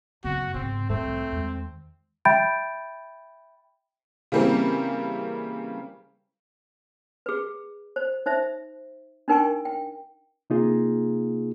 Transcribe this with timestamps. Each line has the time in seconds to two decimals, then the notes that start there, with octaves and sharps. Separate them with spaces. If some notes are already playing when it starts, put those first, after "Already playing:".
0.24 F#2 C#3 B3 F#4
0.54 G#2 C3 C4
0.90 C2 A2 D#3 G3 A3 C4
1.32 E2 G#3
2.25 E5 G5 B5 G6 A6 D7
4.32 C#3 E3 G3 A#3 C4
7.26 G#4 B4
7.96 C5
8.26 D#4 C5 E5
9.28 D4 D#4 A#4 G5 G#5 C#6
9.65 G5
10.50 C3 A#3 D#4 F4 G#4